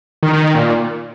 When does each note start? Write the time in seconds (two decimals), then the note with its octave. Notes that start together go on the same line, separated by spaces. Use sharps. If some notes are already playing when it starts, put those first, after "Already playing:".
0.23 D#3
0.33 D#3
0.44 D#3
0.55 A#2